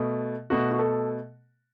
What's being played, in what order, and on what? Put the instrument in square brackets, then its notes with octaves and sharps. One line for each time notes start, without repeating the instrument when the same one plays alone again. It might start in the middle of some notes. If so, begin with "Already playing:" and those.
Already playing: [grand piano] B2 A3
B2 A3 F#4
F#4
A4